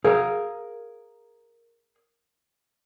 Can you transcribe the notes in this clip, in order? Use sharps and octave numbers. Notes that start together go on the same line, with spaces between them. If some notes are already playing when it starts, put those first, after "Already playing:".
G#4 A#4 F5